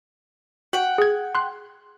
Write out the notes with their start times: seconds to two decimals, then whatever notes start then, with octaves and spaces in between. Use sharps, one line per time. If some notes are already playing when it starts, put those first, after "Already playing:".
0.73 F#4 F#5 G5
0.98 G#4 G#6
1.35 C6 F#6